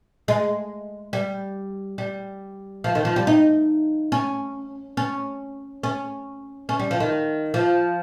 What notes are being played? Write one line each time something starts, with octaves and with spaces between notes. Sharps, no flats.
G#3
G3
G3
F3
D#3
F3
G3
D#4
C#4
C#4
C#4
C#4
G3
F3
D#3
F3